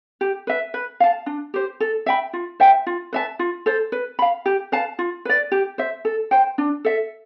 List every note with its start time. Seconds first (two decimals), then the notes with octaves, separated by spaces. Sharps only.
0.21 G4
0.47 B4 E5
0.74 B4
1.00 F5 A5
1.26 D4
1.54 G4 C5
1.80 A4
2.06 E5 G5 B5
2.33 F4
2.60 C5 E5 G5
2.86 F4
3.13 B4 E5 A5
3.39 F4
3.66 A4 C5
3.92 B4
4.19 F5 B5
4.46 G4
4.72 B4 F5 A5
4.99 F4
5.25 B4 D5
5.52 G4
5.78 C5 E5
6.05 A4
6.31 C5 G5
6.58 D4
6.85 A4 E5